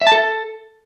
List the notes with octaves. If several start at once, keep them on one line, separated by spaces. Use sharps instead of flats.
E5
A5
A4